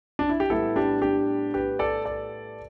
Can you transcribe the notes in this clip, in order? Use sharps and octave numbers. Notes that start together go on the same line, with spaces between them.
D4
E4
G4
A2 G3 B3 E4 A4
D4 G4
D4 G4
G4 B4
A4 D5
A4 D5